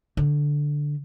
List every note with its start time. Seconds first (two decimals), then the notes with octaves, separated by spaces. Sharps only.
0.17 D3